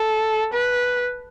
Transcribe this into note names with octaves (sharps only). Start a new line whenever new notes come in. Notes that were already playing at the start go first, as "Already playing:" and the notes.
Already playing: A4
B4